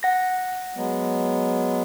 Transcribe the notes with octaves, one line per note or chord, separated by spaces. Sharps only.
F#5 A#6
F#3 G#3 B3